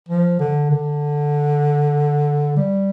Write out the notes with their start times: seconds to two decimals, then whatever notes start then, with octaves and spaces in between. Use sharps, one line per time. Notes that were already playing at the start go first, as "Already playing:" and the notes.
0.09 F3
0.40 D3
0.71 D3
2.57 G3